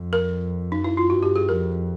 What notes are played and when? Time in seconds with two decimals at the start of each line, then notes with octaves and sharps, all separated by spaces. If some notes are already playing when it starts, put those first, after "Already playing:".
Already playing: F2
0.13 A#4
0.71 F#2 D#4
0.84 E4
0.97 F4
1.10 G2 F#4
1.23 G4
1.36 G#4
1.48 F2 A#4